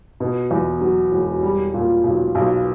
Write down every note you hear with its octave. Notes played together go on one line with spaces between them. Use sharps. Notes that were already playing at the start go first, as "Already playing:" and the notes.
B2
E2
F#3
E1
G3
A#2
B1
B1